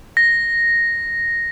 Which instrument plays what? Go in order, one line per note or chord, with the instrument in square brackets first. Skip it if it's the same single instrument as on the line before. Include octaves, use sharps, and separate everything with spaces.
[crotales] A#6